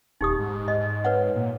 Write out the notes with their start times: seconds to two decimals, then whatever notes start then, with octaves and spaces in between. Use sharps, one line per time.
0.21 D#1 D#4 G4 D#6
0.39 G#2
0.68 D#5
1.05 B4 C#5 F#5
1.35 A#2